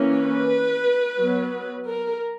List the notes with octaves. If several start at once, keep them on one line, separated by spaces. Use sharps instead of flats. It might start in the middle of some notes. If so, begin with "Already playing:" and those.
Already playing: E3 A#3 C#4
B4
F#3 B3
A#4